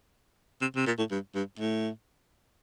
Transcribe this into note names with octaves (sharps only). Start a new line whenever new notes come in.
C3
C3
A#2
A2
G2
G2
A2